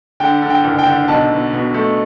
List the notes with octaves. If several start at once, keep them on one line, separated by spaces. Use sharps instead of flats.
D3 G5
D3
G5
F#1
G5
D3
B1 A5
B2
B2
A3